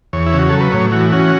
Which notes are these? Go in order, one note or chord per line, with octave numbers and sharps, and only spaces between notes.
E2 C#5
E4
C#3
F#4
F#3 A4
B4
A2 C#5
E3 F#4
C#4 F#4